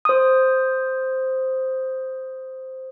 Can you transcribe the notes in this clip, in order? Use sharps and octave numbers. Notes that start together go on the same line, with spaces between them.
C5 D#6